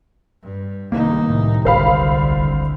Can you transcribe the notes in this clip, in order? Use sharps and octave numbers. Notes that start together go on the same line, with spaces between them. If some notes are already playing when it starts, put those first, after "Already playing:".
G2
C2 D#3 A#3 D#4
C2 A2
G#1 D2 D3 C5 F5 B5
B1
G#1